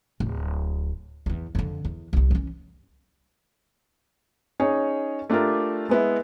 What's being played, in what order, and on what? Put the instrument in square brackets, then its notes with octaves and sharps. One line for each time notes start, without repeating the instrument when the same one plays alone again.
[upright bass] D1
E2 E3
F2 D3
E2
C2 D#4
E3 C#4
[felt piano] C#4 D#4 G#4 C#5
A3 D4 F4 G4 A#4
G#3 B3 E4